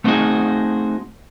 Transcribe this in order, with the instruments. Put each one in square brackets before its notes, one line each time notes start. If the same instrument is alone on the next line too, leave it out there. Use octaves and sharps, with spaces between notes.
[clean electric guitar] A3 B3 C4 D#4 F#4 G#4